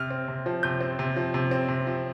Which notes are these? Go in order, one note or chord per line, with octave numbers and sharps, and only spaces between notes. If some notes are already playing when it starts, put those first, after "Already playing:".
Already playing: C3 F6
C4
C3
F3
C3 G6
C4
C3
F3
C3
C4
C3
F3